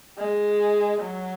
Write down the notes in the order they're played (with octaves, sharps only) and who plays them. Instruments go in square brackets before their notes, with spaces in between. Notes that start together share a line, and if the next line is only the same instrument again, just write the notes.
[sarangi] G#3
F#3